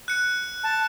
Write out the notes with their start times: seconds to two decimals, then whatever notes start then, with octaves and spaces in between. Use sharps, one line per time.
0.08 F#6 C#7
0.63 A5